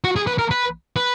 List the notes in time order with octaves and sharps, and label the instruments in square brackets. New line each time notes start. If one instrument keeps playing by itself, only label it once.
[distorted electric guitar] F#4
G#4
B4
A#4
B4
B4